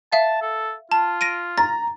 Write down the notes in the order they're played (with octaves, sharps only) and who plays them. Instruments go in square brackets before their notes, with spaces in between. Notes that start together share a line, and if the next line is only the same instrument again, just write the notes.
[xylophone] E5 F5 [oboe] A5
[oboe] A4
[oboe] F4 [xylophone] A5
[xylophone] A#6 D7 D#7
[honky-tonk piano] A#5 [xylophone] A6